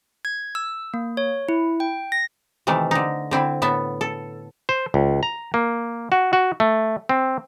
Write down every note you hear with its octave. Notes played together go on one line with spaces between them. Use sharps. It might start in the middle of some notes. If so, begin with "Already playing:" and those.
G#6
E6
A#3
C#5
E4
G5
A#6
C3 D#3 E3 A3
D3 D#4
D3 C4 E4
A2 B3 E5 A5
A4
C5
C#2
A#5
A#3
F#4
F#4
A3
C4